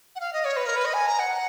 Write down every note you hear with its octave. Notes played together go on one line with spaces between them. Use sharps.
F#5
F5
D#5
C#5
B4
A#4
B4
D#5
G#5
A#5
F#5